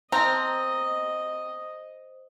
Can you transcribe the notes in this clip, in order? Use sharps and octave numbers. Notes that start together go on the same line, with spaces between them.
C4 C5 D#5 A#5